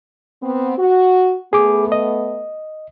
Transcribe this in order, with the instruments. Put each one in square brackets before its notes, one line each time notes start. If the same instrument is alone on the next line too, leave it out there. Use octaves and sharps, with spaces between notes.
[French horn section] B3 C4
F#4
[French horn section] A3 B3 [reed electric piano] G#4 D6
[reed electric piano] D#5